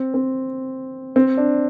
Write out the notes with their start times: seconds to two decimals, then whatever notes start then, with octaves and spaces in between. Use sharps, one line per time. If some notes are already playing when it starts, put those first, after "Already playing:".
Already playing: C4
0.14 C4
1.16 C4
1.38 D4